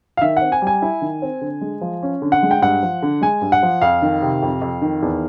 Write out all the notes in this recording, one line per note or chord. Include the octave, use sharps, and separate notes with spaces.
F5
D#3 E5
C4 F#5
G#5
G3
G#5
E4
D#3
C4
D3
G#3
F3
C#4
D3
F#5
G#3
G5
G2 F#5
F3
D3
G#3 G#5
G2
F#5
F3
F2 F5
D#3
C3
F2
F2
D#3
E2